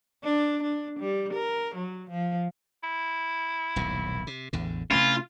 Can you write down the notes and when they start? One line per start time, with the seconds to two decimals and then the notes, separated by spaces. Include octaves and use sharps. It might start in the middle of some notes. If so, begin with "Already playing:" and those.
0.24 D4
0.63 D4
0.99 G3
1.33 A#4
1.75 F#3
2.10 F3
2.83 E4
3.76 D#1 B1 A2
4.27 C3
4.53 A1 E2 D3
4.91 C3 E3 A3 C#4 F4